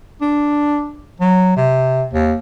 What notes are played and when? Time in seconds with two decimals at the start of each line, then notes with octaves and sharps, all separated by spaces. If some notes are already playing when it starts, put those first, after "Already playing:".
0.21 D4
1.21 F#3
1.57 C3
2.13 D#2